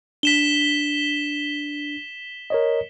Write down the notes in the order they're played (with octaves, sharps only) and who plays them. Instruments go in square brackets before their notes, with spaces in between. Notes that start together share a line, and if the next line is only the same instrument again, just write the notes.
[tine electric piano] D4 [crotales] B6 E7 G7
[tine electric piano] A#4 C#5 D#5